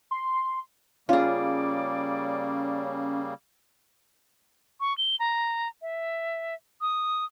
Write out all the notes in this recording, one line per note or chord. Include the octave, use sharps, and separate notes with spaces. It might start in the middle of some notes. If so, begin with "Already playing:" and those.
C6
C#3 G3 A#3 C#4 F4 G#4 D5
C#6
G7
A#5
E5
D#6